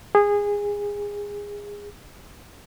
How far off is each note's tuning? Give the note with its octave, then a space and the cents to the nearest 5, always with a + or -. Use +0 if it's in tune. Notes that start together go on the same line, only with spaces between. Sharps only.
G#4 -20